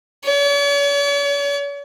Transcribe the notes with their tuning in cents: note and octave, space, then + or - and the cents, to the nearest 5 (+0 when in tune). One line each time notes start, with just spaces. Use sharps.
C#5 +45